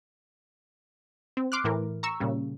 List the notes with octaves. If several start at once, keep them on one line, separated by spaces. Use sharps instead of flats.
C4
C6 D6 F6 F#6
A2 E3 A#4
A#5 C#6 E6
A#2 C#3 G3